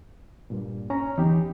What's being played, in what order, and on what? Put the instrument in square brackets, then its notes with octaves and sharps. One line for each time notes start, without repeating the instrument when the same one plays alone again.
[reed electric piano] G2 A#2
C#4 A#5
[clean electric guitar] E2 [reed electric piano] D#4 G4